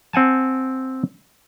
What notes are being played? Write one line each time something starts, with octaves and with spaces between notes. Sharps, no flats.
C4 F#5 G#5 A5